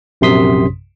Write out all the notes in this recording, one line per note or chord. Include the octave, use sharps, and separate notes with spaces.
A#1 F#2 C3 C6 D#6 B6